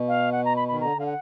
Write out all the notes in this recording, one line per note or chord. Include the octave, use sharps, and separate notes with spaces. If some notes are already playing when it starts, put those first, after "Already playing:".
Already playing: B2
F5
F#5
A#5
B5
D#3 B5
D3 A#5
D3 F5
F#5